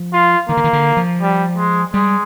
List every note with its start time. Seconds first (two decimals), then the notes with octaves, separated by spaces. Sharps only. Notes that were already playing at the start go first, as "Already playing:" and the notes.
Already playing: F3
0.13 F4
0.49 D#3 A#3
0.57 D3
0.64 D#3
0.73 D3
0.97 F3
1.21 G3
1.57 G#3
1.94 G3 G#3